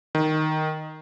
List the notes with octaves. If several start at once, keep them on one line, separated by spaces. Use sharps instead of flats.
D#3